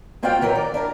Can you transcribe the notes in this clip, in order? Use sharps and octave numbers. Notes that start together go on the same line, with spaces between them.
A#3 C4 F4 F#4 F5 G5
D#3 E3 F#3 A#4
D5
D4 E4 A#4